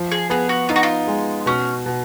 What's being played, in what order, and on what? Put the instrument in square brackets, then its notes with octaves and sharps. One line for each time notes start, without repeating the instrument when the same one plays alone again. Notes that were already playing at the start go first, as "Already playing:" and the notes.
Already playing: [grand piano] F3
[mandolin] G#4
[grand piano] B3 [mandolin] G#4
[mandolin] F#4
[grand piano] D#4 [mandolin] F4
[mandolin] F#4
F4
[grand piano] G#3
[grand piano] B2 [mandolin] C#4
[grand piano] B2